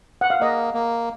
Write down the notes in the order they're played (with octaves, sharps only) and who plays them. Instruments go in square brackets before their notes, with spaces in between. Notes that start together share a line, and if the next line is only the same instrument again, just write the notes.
[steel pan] F#5
F5
[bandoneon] A#3 [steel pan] D#5
[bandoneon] A#3